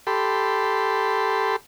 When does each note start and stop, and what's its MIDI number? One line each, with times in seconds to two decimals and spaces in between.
0.07 1.56 67
0.07 1.56 69
0.07 1.56 83
0.07 1.56 84